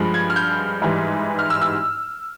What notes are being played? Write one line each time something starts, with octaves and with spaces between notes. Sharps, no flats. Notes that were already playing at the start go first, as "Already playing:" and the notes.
Already playing: G2 F3 G#3
G#6
F6
G6
G#2 E3 G3
F6
E6
E6